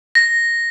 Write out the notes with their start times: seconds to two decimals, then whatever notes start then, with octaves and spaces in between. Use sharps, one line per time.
0.15 A#6